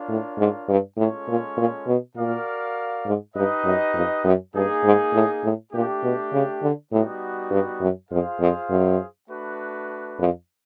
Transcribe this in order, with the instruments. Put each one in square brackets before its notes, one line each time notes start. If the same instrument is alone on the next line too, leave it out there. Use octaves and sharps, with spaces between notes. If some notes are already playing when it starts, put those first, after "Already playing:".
Already playing: [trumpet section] D4 F4 A#4 C#5 F5
[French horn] A2
G#2
G2
[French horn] A2 [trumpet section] G#3 C#4 F4 A4 C#5
[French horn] A#2
A#2
B2
[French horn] A#2 [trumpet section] F#4 A#4 D5 F5
[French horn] G#2
[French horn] G2 [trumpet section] D#4 G4 B4 D#5
[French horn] F#2
F2
F#2
[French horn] G2 [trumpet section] A#3 D#4 G#4
[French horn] G#2
A2
A2
[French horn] A#2 [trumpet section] A3 D4 G4
[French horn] B2
C#3
D3
[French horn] A2 [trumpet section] G3 B3 D#4 F#4
[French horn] G2
F#2
[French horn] F2 [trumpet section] F4 G#4 C5 F5
[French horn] F2
F#2
[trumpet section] A3 D4 F#4 B4
[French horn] F2